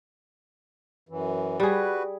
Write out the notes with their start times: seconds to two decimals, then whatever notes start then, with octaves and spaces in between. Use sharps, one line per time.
1.09 F#2 E3
1.60 G3 F#4 G#4 B4